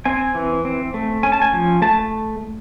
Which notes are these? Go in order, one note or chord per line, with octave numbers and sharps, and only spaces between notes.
C4 G#5
E3
C4
A3
C#4 G#5
A5
G#5
F3
A3 A5